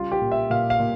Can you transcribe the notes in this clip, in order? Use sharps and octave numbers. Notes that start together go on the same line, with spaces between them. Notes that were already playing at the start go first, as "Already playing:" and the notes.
Already playing: C#3 G3 F4
G4
A#2
E5
A#2 F5
F5
A#2